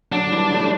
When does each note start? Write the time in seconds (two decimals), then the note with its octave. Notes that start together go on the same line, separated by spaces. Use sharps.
0.12 D3 F#3 D4
0.32 E3 G3
0.52 F#3 A3